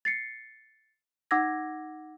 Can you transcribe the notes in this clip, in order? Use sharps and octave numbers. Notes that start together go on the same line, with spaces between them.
A6 C7 C#7
D#4 F#5 D6 E6 G#6 A#6